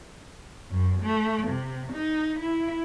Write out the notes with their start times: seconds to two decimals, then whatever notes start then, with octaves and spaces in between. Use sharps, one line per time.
0.70 F#2
1.02 A3
1.48 C3
1.92 D#4
2.39 E4